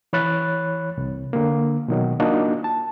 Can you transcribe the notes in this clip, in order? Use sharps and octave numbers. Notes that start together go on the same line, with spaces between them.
E3 C#5 B5 F#6 A6
C2
D3 A#3
B2 D#3 F#3
A#3 D4 D#4 F4 F#4
A5